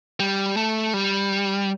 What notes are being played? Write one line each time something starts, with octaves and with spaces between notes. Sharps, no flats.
G3
A3
G3